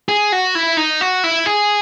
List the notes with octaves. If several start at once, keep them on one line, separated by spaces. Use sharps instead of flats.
G#4
F#4
E4
D#4
F#4
E4
G#4